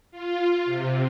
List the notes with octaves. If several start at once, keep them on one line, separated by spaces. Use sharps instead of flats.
F4
C3